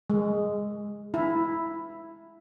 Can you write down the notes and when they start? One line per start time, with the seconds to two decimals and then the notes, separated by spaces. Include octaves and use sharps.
0.10 G#3
1.14 E4